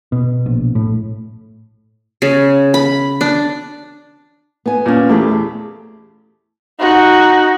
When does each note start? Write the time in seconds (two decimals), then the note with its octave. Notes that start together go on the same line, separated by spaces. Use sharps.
0.12 B2
0.46 A#1
0.75 A2
2.22 C#3
2.74 B5
3.21 D4
4.66 B3 G#5
4.86 A#2 C#4
5.09 E2 A3 G4 G#4
6.80 D#4 F#4